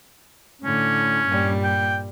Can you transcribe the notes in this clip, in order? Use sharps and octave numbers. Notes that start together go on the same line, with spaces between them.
A2 D3 C#4
G2 A#2 G3
G5